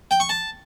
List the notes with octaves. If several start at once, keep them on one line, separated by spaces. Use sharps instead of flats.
G5
C#6
A5